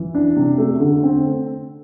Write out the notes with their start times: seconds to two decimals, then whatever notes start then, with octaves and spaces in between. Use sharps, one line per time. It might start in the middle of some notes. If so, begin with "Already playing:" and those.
Already playing: E3
0.14 D4
0.36 C3
0.58 A3
0.80 D3
1.03 C4